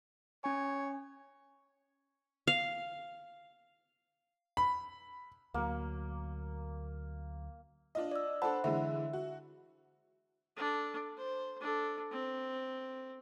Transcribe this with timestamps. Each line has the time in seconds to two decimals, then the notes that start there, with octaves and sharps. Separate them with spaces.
0.44 C#4 C#5 G#5
2.47 F5
4.57 B5
5.54 D2 F#3 A#3
7.95 D4 F4 D#5
8.11 D5 E6
8.42 D4 A4 C5 F#5 A5 B5
8.64 D3 E3 G#3 E5
9.13 F#4
10.57 D4 A4
11.17 C5
11.61 D4 A4
12.12 C4